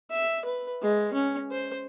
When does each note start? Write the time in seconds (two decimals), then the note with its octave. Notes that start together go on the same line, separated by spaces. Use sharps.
0.11 E5
0.45 B4
0.82 G#3
1.13 C#4
1.51 C5